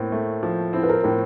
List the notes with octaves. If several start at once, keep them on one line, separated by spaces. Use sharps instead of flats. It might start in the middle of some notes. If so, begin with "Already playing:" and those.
Already playing: A2 A#3 C4
A3
F3
C4 E4
B4
A#4
A2 A#4